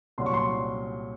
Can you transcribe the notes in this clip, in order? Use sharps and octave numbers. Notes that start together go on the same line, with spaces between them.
C2 A#2 F#3 C6
C#6
C6